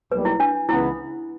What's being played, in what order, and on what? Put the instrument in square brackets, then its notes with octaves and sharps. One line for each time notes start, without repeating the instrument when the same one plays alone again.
[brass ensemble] B1 A#2 G3 [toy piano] B4
[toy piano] E4
D4
[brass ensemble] C#2 C#3 E3 B3 [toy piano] E4